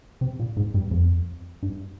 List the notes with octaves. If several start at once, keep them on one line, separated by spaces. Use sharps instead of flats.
C3
A#2
G#2
G2
F2
G2